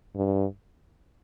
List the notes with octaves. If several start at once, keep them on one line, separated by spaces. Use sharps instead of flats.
G2